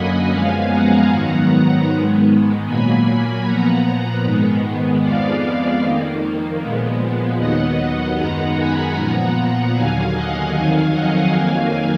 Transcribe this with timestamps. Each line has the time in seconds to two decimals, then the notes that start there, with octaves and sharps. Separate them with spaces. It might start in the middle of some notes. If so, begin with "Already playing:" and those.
Already playing: F#2 D3 F#3 A#3 D#5 F#5 G#5 B5
0.30 F#2 F3 G#3 B3 F5 G#5
0.70 F#5 A#5
1.09 G#2 D#3 F#3 B3
1.88 G#2 D#3 G#3 B3
2.66 A#2 F#3 A#3 G#5 B5
3.45 A#2 F3 B3 F#5 A#5
4.24 G#2 D#3 G#3 B3
5.02 F2 F3 G#3 B3 D5 F5
5.81 F2 D#3 A#3
6.59 A#2 F3 G#3 B3
7.38 D#2 D#3 F#3 B3 D#5 F#5
8.17 F#2 D#3 G#3 B3 F#5 A#5
8.56 G#5 B5
8.95 A#2 F3 B3 F#5 A#5
9.74 D#2 D3 F#3 F5 G#5
10.13 D#5 F#5
10.53 F2 D#3 F#3 F5 G#5
10.92 D#5 F#5
11.31 F2 D#3 F#3 A#3 F5 G#5